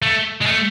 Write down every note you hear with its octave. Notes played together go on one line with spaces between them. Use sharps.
A3
G#3
A3